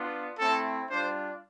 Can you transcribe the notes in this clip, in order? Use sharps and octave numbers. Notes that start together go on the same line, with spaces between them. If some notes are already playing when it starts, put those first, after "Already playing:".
Already playing: B3 D4 F4
A3 C4 E4 A4
G3 D4 F4 C5